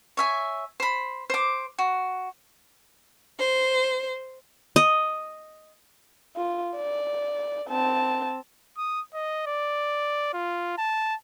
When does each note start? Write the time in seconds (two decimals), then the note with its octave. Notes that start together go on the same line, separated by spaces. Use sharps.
0.17 C#5 E5 G#5
0.80 C5 B5
1.30 C5 D6
1.79 F#4
3.38 C5
4.76 D#5
6.36 F4
6.75 D5
7.69 C4 A5
8.78 D#6
9.14 D#5
9.47 D5
10.34 F4
10.78 A5